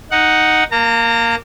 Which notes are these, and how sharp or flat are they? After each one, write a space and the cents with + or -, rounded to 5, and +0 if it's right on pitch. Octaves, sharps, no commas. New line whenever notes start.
D#4 +0 F#5 +0
A#3 +0 A#5 -35